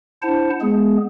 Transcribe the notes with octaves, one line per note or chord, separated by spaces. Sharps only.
D4 E4 C5 F#5 A5
G#3 B3 G#4